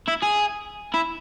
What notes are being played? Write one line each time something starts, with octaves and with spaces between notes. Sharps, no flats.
E4
G#4
E4